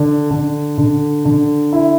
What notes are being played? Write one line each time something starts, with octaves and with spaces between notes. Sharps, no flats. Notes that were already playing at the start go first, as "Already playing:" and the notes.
Already playing: D3
D3
D3
D3
E4